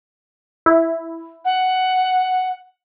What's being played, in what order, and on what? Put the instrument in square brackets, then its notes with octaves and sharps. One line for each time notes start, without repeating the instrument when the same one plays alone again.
[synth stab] E4
[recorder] F#5